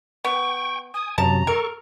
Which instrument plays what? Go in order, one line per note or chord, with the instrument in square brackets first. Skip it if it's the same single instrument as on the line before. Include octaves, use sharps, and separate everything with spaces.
[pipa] B3 [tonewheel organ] G5 [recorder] C#6
[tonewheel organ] G#5 [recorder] D#6
[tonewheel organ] F#2 C3 F#3 [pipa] F3 A5 [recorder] A#5
[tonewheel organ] A4 C#6 [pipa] A#4